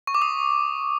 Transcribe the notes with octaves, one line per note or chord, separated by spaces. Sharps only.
C#6
D6
D#6